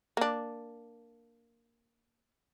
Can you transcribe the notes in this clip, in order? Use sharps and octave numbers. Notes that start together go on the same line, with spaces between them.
A#3 D4